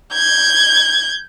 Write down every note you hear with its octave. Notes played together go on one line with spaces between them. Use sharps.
G6 G#6